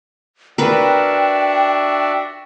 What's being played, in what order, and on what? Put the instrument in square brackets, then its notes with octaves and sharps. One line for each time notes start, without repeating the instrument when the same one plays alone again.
[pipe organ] D4 F#4 E5 [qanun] A#4 B4 [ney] G5